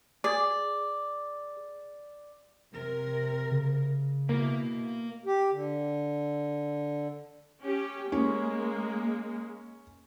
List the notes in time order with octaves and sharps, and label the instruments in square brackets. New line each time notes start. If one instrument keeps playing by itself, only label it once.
[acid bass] G#4 [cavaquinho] D5
[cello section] C3 A#4
[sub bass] C#3
[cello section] B2 E4 [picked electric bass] A#3
[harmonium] G4
D3
[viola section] C#4 G4
[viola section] G#3 A#3 [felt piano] C#4